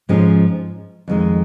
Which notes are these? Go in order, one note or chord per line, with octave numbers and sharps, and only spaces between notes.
G#2 F3 G#3 C#4
F2 D#3 G#3